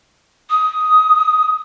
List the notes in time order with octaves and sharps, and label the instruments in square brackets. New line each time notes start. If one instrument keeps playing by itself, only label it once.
[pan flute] D#6